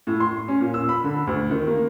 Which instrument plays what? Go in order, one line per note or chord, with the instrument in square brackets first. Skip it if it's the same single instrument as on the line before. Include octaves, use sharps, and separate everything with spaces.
[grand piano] A2
C6
C#4
A#2
E6
B5
D3
D2
D#3
A#3